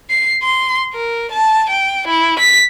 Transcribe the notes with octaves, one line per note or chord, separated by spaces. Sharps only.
C7
C6
A#4
A5
G5
E4
B6